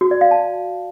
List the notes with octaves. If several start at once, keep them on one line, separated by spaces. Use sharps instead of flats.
F#4
D5
F5
A5